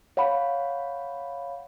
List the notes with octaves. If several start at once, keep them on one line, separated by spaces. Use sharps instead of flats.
C#5 F5 F#5 B5